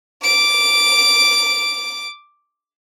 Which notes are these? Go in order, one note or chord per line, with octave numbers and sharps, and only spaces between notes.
D6 D7